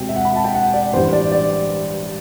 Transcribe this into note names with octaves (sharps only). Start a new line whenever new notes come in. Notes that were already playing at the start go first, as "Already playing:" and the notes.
Already playing: E1 D2 C3 G5
E5
F#5
B5
A5
G5
F#5
D5
A1 G2 E3 G3 C5
D5
D5